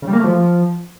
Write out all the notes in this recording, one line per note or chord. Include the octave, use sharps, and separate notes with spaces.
C#3
G3
A#3
A3
F3